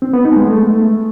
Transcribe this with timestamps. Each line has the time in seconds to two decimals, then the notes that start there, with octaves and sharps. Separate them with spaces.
0.02 C4
0.13 B3
0.25 D#4
0.36 G#3
0.48 A3